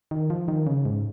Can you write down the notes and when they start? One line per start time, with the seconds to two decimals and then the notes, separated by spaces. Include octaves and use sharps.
0.11 D#3
0.30 F3
0.48 D#3
0.67 C#3
0.85 G#2